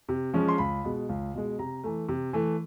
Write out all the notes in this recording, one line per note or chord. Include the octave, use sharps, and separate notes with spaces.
C3
F3 G#3 C#4
C6
C#2 B5
B2 G#3
C#2
B2 G#3
C3 A#5
E3 A3
C3
E3 A3